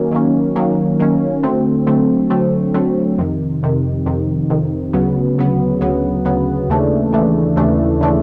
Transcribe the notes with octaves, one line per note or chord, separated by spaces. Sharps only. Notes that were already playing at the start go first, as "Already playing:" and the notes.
Already playing: D#3 F#3 A#3 C#4
D#3 F#3 A#3 C#4
D#3 F#3 A#3 C#4
D#3 F#3 A#3 C#4
D3 F#3 A3 C4
D3 F#3 A3 C4
D3 F#3 A3 C4
D3 F#3 A3 C4
F2 C3 D#3
F2 C3 D#3
F2 C3 D#3
F2 C3 D#3
D2 C#3 F#3 B3
D2 C#3 F#3 B3
D2 C#3 F#3 B3
D2 C#3 F#3 B3
D#2 C#3 E3 A3 D4
D#2 C#3 E3 A3 D4
D#2 C#3 E3 A3 D4
C#3 E3 A3 D4